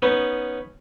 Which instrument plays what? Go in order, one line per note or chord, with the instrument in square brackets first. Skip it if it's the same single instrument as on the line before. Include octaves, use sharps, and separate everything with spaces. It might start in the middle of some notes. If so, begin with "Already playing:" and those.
[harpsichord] B3 C#4 D#4 B4